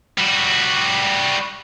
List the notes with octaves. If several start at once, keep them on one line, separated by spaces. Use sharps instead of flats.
G3 F#4